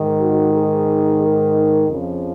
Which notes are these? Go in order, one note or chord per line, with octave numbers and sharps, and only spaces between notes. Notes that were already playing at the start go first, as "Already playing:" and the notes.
Already playing: G#2 D#3
F#4
G#4
A#4
F2 C#3 F3